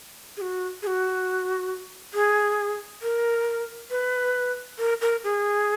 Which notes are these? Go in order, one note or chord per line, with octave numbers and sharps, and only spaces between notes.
G#4
F#4
G#4
F#4
G#4
A#4
B4
A#4
A#4
G#4